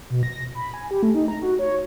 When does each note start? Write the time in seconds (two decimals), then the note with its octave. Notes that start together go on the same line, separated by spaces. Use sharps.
0.10 B2
0.23 A#6
0.55 B5
0.74 G#5
0.91 G4
1.03 A3
1.15 D#4
1.28 A#5
1.42 F#4
1.59 C#5